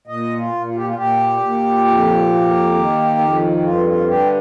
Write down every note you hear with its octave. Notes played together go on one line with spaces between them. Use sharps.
A#2 D#5
F4
A#2
F4
G4
F4
A#2 G4
A#2
F2
A#3
D#3
F2
G2 F4
F4
D3 G4